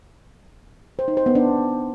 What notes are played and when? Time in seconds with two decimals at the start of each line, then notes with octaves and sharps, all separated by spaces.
0.99 C5
1.08 D#4
1.17 C5
1.26 B3
1.35 D4